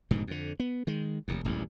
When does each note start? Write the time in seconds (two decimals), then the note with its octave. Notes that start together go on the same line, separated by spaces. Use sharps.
0.11 F1 G#2 B2 D3
0.27 F2 D3
0.60 B3
0.87 D#3 G#3
1.28 F1 D#2
1.45 D#1 A1 E2 G2